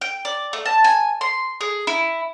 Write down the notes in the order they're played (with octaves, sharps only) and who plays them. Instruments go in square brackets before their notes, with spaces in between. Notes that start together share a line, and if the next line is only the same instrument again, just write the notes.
[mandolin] G5
D5
A3
A5
G#5
C6
G#4
E4